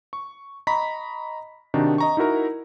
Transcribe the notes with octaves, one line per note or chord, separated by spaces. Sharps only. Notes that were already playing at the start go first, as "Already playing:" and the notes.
C#6
D#5 A#5 B5 C#6 B6
C3 D#3 D4 D#4 F#4
D#5 A#5 C#6
D#4 E4 F#4 A#4 A#5